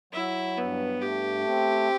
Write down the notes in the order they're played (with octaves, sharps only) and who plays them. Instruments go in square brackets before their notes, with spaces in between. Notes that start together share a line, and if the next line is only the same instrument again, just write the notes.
[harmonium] F#3 [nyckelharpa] E4
[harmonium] G2 [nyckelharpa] B3
[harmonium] A3 [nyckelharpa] G4
[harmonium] C4